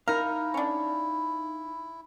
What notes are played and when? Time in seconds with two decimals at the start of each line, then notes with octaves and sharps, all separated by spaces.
0.08 D#4 E4 A#4 F5
0.54 C#4 D4